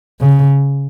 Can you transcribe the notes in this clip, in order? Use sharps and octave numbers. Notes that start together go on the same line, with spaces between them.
C#3